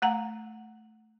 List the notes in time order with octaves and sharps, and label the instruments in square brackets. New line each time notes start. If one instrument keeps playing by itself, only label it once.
[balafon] A3 F#5 A#5